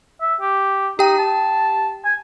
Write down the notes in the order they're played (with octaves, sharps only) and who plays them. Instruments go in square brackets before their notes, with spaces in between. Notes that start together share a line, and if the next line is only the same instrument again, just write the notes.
[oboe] E5
G4
[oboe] D#4 [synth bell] G4 G5
[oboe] A5
G#5